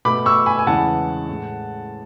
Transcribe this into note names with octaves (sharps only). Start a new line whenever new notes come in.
B2 A3 B5 D6
C#6 E6
G#5 B5
G#5
E2 C#3 E3 G#3 F#5 A5
A2 G#3